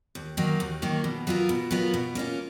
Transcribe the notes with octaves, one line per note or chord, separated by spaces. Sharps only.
D#2
D#3 F#3 A#3
D#2
D#3 F#3 A#3
B2
F#3 B3 F4 A#4
B2
F#3 B3 F4 A#4
B2
A#3 C#4 F4